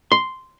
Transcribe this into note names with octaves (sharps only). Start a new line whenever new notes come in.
C6